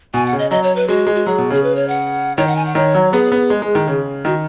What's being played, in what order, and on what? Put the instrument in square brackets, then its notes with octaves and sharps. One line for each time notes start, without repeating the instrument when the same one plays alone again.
[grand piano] B2 [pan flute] G#5
[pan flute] F#5
[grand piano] C#3
[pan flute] D#5
[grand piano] F#3 [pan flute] D#5
[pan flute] C#5
B4
[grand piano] G#3 [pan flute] F#4
[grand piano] G#3
[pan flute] F#4
[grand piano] F#3 [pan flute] G#4
[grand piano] B2
[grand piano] C#3 [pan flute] G#4
[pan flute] B4
C#5
F#5
[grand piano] D#3 [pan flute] C#5
[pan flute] F#5
G#5
F#5
[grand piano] D#3 [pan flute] C#5
[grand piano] F#3
[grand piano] B3 [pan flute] G#4
[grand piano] B3
G#3
G#3
D#3
C#3
[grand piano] D#3 [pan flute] F#4